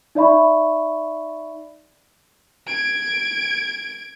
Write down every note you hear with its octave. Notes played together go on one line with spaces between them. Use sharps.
D#4 D5 E5 B5 C#6
G#6 D7